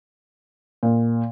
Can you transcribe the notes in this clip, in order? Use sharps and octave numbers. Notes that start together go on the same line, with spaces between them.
A#2